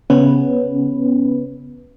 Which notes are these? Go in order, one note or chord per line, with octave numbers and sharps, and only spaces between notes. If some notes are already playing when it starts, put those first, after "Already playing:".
C#3 B3 C#4 B4